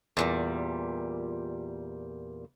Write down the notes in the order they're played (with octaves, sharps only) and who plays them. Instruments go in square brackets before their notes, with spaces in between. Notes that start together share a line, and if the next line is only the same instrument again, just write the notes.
[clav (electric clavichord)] E2 [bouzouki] A#2 D#3 G3